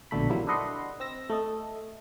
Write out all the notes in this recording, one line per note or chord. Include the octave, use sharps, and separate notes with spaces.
A#1 B2 D3 A3 B5
E3 F#3 G3 A#3 C4 E4
D4 A4 B4 D#5 F#5 C6
C4 E6 A#6
A3 A4 D#5